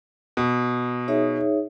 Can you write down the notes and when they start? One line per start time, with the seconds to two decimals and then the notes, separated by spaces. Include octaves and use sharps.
0.37 B2
1.08 D#4 G#4 C#5 E5